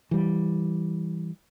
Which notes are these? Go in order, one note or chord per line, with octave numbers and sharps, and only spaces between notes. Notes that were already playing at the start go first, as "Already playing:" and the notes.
E3 G3